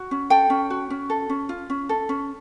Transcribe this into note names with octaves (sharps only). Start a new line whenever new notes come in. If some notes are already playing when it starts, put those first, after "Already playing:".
Already playing: F#4
C#4
A4 G5
C#4
F#4
C#4
A4
C#4
F4
C#4
A4
C#4